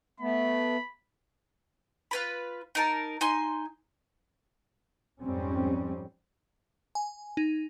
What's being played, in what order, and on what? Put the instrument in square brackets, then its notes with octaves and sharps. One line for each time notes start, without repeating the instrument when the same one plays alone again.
[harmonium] A3 B3 [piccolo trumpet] B5
[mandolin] F4 B4 B5
D#4 A#4 A5
D#4 G#5 C6
[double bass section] F2 G#2 G3 C4 C#4
[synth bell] G#5
D#4